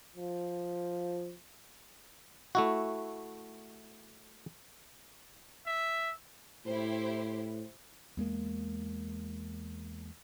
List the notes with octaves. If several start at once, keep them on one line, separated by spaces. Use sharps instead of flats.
F3
A3 E4 F#4
E5
A2 E4 G4 C5
E2 G#3 A#3